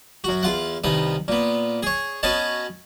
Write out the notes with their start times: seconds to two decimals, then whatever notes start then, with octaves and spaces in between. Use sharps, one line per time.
0.24 F#2 F#4
0.43 E2 F4 F#5
0.84 C2 D#3 B3 D#6
1.28 A#2 B3
1.83 G#4 C#5
2.23 B3 C#4 F#4 C#5 D#5 A5